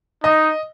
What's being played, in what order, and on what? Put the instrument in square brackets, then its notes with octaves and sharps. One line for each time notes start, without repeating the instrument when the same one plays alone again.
[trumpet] D#4 [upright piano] D#5